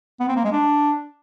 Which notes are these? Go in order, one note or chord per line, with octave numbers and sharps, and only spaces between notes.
B3
C4
A#3
G#3
D4